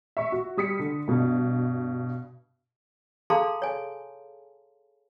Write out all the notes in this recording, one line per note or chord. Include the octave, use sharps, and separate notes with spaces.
E5 C#6
F#4
G3 D#6 B6 C#7
D3
G2 B2
G#4 A4 F5 A5 A#5 C6
C#5 G#5